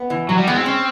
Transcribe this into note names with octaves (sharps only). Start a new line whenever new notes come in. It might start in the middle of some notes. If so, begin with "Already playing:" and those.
Already playing: B3
E3
F#3 F#4
G3
G#3 B3
C4
C#4